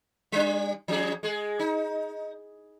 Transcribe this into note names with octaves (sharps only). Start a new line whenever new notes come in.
G3 D4
F3 C#4 G#4
G#3 G#4
D#4